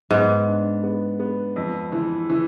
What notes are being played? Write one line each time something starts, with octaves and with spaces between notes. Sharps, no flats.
G#2 B3
D4
B3
B3
F2
E3
E3